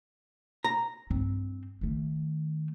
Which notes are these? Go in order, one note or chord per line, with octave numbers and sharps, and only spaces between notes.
A#5
G2 C4
D#3 A3